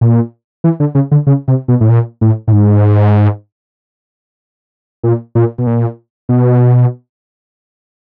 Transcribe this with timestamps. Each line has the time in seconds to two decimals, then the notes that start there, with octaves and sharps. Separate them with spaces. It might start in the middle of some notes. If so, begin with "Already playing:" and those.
0.01 A#2
0.64 E3
0.80 D3
0.95 C#3
1.11 D3
1.27 C#3
1.48 C3
1.68 B2
1.81 A2
1.89 A#2
2.21 A2
2.48 A2
2.52 G#2
5.03 A#2
5.35 A#2
5.58 B2
5.67 A#2
6.29 B2